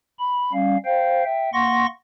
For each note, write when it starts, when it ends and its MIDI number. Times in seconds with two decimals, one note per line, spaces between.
0.19 0.51 83
0.53 0.77 55
0.53 0.77 61
0.53 0.77 77
0.85 1.24 72
0.85 1.24 77
0.85 1.24 79
1.24 1.50 76
1.24 1.50 79
1.53 1.86 58
1.53 1.86 78
1.53 1.86 84
1.53 1.86 85
1.53 1.86 94